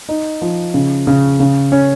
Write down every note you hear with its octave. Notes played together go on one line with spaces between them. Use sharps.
D#4
F3
C#3
C#3
C#3
C#4